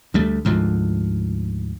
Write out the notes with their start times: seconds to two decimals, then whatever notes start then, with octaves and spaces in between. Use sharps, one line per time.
0.14 D2 G3 A3
0.45 D2 G#2 F3